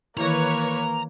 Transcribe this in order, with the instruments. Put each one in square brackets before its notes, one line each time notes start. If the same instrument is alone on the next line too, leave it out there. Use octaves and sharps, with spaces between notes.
[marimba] D#3 E3 E4 [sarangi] A#3 [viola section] B4 C#5 [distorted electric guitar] A#5